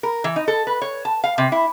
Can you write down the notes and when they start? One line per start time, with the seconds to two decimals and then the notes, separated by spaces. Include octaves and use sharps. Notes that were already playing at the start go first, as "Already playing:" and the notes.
0.03 A#4
0.24 E3
0.36 D#4
0.48 A4
0.67 B4
0.82 C#5
1.05 A5
1.24 F5
1.38 C3
1.52 E4